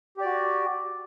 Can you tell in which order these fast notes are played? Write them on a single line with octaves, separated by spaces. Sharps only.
G4 D5 F#4